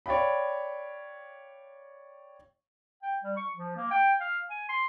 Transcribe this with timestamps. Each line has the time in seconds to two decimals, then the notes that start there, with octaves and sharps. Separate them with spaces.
0.06 C#5 D5 F5 G5 B5
3.02 G5
3.23 G3
3.37 C#6
3.55 F3
3.76 A#3
3.91 G5
4.20 F5
4.50 G#5
4.69 C6